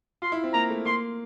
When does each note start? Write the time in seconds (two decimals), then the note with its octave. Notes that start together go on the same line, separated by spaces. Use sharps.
0.22 F4 C6
0.32 E4
0.44 C4
0.54 A#3 A#5
0.70 A3
0.86 A#3 C6